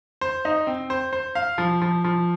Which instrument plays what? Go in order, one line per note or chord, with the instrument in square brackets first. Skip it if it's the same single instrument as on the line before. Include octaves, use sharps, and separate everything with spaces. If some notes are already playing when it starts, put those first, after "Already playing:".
[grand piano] C5
D#4
C4
C5
C5
F5
F3
F3
F3